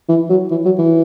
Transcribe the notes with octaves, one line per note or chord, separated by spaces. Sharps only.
E3
F#3
E3
F#3
E3